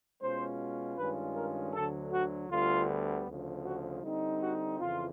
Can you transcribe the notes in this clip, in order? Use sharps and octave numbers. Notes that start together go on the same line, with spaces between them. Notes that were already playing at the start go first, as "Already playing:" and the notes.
B2 G#3 C#4 F4 C5
G2 D#3 G#3 C#4 F4 B4
A#4
D2 D3 F#3 A4
F#4
D2 D3 G3 B3 F4
D2 C#3 F3
F#4
D3 G3 C4 D#4
F#4
F2 C#3 E3 F4